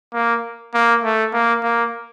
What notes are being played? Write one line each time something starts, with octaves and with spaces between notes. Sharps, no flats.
A#3
A#3
A3
A#3
A#3